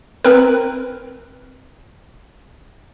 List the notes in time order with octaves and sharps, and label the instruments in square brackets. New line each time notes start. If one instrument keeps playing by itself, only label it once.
[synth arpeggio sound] C4 A#4 B4